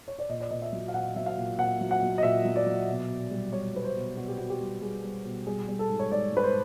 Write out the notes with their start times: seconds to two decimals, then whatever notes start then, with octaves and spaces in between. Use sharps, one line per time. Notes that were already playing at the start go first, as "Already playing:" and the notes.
0.08 C#5
0.19 D5
0.29 A#2 D#5
0.40 D5
0.51 A#2 D#5
0.62 E5
0.72 F#3
0.88 F5
0.94 A#2 F#5
1.16 F#3 E5
1.26 F5
1.37 A#2
1.58 A#2 F#5
1.81 F#3
1.91 F#5
2.02 F#3
2.18 D#5
2.23 A#2 E5
2.45 F#3
2.56 D5
2.66 F#3
2.88 B2
3.09 B2
3.31 G3
3.53 G3 C#5
3.74 G3 B4
3.84 C5
3.96 B2
4.17 B2 F#4
4.28 G4
4.38 B2 F#4
4.50 G4
4.60 G3
4.82 G3 G#4
5.04 G3
5.25 B2
5.47 G3 G#4
5.68 G3
5.79 A4
5.90 G#2
5.99 C#5
6.11 G#2 D5
6.32 G#2 B4
6.43 C5